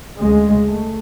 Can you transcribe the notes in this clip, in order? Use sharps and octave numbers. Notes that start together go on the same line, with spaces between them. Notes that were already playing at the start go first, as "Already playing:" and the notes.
D2 C#3 G#3
A3